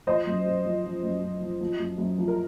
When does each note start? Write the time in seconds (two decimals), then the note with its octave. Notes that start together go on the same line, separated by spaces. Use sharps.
0.07 F3 C5 D#5
0.27 F#2
0.46 F#2
0.65 F3
0.84 F3
1.03 F#2
1.22 F#2
1.41 F3
1.61 F3
1.79 F#2
1.98 F#2
2.18 F3
2.28 A#4